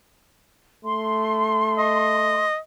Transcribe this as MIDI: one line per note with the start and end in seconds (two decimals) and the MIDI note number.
0.85 2.48 57
0.85 2.45 84
1.78 2.58 75